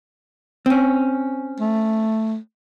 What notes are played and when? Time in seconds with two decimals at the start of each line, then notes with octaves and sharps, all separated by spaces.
0.66 C4 C#4
1.60 A3